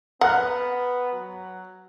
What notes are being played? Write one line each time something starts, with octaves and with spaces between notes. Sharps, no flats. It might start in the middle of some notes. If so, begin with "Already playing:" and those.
B3 F#5 A#5 F6 F#6
F#3